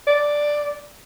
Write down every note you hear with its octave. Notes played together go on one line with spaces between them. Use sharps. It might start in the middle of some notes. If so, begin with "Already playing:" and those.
D5